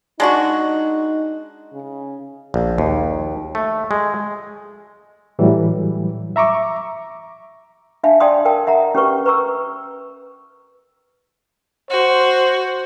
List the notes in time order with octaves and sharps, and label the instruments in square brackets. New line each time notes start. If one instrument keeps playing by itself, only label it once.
[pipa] G#3 D4 F#4 [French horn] D#4
[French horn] C#3
[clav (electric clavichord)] A#1
D#2
A3
G#3
[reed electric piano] A2 E3 F#3 G3
E5 A#5 C#6 D6
[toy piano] D4 E5 F5 A5
D5 G5 A5 C6 D#6
A#4 F5 G5 A5
E5 F#5 A#5
C#4 G4 A#4 B4 C#6
B4 A#5 C#6 E6
[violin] F#4 [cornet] C5